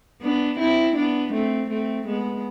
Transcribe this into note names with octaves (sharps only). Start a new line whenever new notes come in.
B3 D4
C4 E4
B3 D4
A3 C4
A3 C4
G#3 B3